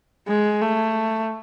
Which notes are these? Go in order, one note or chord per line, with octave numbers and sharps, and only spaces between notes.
G#3
A3